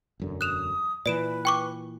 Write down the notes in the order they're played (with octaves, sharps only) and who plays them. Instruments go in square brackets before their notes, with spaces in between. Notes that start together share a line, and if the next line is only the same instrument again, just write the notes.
[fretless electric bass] E1 F#2 D3
[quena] D#6 [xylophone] F#6 E7 F7
[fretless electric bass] A#2 E3 [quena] B4 [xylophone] D5 D7 E7
[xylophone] G5 C#6 D6